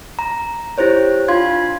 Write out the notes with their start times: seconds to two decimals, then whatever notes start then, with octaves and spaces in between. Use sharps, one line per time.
0.19 A#5
0.78 E4 G4 C5 C#5
1.28 D4 F4 F5 C6 G#6